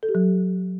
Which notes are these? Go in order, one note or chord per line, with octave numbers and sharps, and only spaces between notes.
A4
G4
F#3